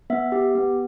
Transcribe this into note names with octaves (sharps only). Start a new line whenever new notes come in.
B3 E5
G4
B3